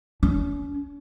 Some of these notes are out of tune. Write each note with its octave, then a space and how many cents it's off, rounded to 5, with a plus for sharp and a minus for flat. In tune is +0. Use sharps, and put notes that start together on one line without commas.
C#4 +45